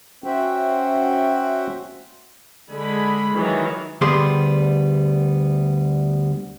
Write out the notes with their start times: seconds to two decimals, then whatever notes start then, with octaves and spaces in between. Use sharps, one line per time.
0.24 C#4 F#4 C5 E5 F#5 G5
2.70 D3 G#3 G#4 B5
3.34 D#3 E3 F#3
4.01 D2 G3 B3 G4 G#4 C6